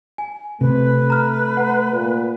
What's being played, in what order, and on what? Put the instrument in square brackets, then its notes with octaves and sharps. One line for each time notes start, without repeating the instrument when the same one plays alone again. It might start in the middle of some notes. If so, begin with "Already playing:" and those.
[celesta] G#5
[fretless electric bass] C3 [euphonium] A3 [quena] B4
[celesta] A#5 F6
F#5 A#5
[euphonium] A#2